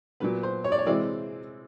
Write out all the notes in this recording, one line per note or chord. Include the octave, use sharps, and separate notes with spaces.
A#2 F#3 B3 B4
C5
C#5
D5
C#5
C3 E3 G#3 C4 D5